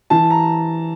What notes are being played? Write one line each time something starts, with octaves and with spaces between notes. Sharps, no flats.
E3 A5
A#5